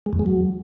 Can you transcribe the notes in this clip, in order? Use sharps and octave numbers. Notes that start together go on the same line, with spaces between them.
G#3
E2
G#3
F#3